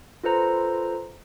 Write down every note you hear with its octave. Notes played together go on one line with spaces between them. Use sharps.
F4 A4 B4 C5 A#5